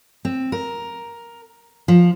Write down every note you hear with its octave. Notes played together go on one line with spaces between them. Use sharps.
C4
A#4
F3